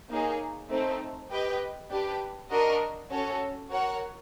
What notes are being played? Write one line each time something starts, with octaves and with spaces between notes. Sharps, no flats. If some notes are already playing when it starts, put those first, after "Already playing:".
A#3 D#4 G#4 C#5
A3 C4 D#4
G4 B4 D#5 G5
D4 G4 B4
D4 F#4 A#4 D#5
C#4 F#4 A4 C#5
F#4 A#4 C#5 F#5